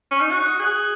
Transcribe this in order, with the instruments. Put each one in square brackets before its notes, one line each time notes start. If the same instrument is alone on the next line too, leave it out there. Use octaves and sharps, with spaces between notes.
[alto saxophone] C#4
D#4
[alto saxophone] F#4 [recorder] C#6
[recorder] D#6
[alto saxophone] G#4 [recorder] F#6